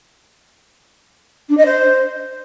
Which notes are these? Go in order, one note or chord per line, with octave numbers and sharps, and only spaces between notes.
D4
D#5
C5